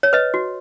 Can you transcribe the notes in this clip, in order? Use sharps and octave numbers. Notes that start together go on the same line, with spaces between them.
C#5
B4 D#5
F#4